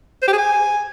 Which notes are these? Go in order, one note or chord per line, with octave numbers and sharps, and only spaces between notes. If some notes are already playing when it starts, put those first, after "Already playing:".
C5
G4
G#4
G#5